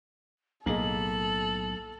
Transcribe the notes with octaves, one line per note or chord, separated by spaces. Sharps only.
B1 A2 A#3 G#4 A4 D#5 F#7